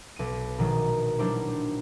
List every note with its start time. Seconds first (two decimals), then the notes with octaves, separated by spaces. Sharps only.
0.16 B1 D#7
0.58 A#1 B2 D#3 F#3
1.19 F#3 G3 D4 E4 G4 C5